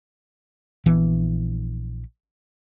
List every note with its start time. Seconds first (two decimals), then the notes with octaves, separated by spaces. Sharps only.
0.86 A#1 E3 B3